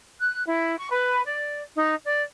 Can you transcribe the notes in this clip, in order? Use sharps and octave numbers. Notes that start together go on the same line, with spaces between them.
F#6
E4
C#6
B4
D5
D#4
D5